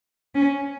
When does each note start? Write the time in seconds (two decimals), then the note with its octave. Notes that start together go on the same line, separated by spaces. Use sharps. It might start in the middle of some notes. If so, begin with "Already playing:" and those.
0.35 C#4